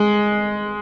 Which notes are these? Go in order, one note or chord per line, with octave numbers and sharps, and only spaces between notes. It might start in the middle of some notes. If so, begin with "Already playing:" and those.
Already playing: G#3